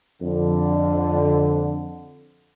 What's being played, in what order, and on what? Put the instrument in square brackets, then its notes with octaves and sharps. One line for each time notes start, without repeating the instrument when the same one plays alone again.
[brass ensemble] F2 D3